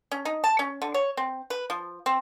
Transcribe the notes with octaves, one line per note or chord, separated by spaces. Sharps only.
C#4
D#4
A5
C#4
D3
C#5
C4
B4
F3
C4